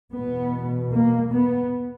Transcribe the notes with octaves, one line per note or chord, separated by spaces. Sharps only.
E2 B2 B3
A#3
B3